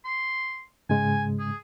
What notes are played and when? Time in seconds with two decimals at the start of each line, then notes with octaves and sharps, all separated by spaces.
0.05 C6
0.90 G#2 C#3 G#3 G#5
1.39 G#4